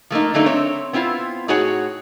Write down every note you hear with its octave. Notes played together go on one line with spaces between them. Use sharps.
F3 A3 A#3 D#4
D3 F#3 A3 A#3 D4 D#4
C4 C#5 E5
B3 C4 E4 F4 C5
A2 D#4 F#4 G#4 C#5 F#5